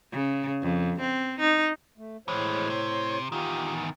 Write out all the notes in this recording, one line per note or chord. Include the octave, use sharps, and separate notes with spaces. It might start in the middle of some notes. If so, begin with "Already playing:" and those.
C#3
F2
C4
D#4
A3
A2 E3 G#3 C5 C#5
C3
E2 D#3 F4 G4